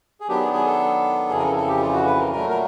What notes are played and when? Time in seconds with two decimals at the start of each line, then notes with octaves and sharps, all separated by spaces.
0.21 G#4
0.28 D#3 F#3 B3 D4 G4
0.41 G#4
0.53 G#4
0.66 A4
1.29 F2 C#3 E3 G#4
1.39 A#4
1.43 A4
1.56 A4
1.68 G4
1.82 F4
1.93 F#4
2.06 B4
2.19 A#4
2.32 A#2 F#3 A3 A#4
2.50 A#4